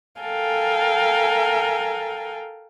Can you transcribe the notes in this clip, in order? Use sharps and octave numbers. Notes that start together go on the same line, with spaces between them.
A4 A#4 F5 G5 G#5